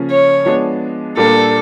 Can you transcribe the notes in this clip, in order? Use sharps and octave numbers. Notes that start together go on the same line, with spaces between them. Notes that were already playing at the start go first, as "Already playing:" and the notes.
Already playing: C#3 F3 A#3 C#4
C#5
F3 G#3 B3 D4
A#2 G3 A#3 D4 A4